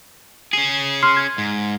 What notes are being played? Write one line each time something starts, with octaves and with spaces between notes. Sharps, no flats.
C#4 G#4 C7 D#7
C6 F6 C7
G#6
G#2